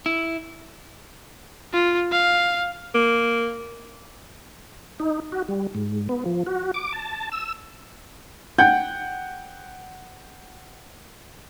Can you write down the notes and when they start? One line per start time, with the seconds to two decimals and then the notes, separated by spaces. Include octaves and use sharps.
0.06 E4
1.74 F4
2.12 F5
2.95 A#3
5.00 D#4
5.32 F#4
5.49 G3
5.75 G#2
6.09 B3
6.26 F3
6.46 F#4
6.74 D6
6.93 A5
7.32 E6
8.58 F#5 G5 G6